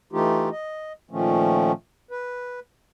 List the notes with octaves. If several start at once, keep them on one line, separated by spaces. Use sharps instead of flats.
E3 A3 D#4 F4 G4
D#5
A#2 D#3 F3 A3 C#4
B4